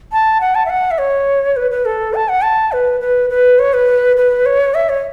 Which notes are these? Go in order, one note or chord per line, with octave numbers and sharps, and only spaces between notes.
A5
F#5
A5
E5
F#5
E5
C#5
B4
B4
A4
A5
F#5
A5
B4
B4
B4
C#5
B4
B4
C#5
E5
C#5